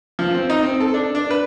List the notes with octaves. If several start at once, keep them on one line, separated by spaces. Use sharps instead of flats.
F3
C4
D#4
C4
A4
D4
D4
B4